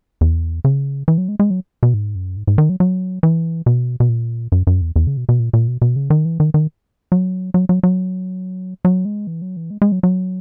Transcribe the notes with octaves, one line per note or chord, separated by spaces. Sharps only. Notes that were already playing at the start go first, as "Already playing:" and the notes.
E2
C#3
E3
F#3
G#3
G#3
F#3
B2
G#2
F#2
G#2
G#2
D#3
F#3
F#3
E3
B2
B2
A#2
F#2
F#2
E2
E2
C#3
B2
B2
A#2
A#2
B2
B2
C#3
D#3
E3
D#3
D#3
F#3
F#3
F#3
F#3
F#3
G#3
E3
F#3
E3
G#3
G#3
F#3
F#3